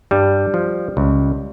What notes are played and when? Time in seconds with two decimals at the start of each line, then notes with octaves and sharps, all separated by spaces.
0.11 G2 G3
0.54 F3
0.97 C#2